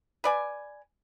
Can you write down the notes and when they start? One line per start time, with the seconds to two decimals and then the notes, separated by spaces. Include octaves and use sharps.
0.24 B4 D5 G#5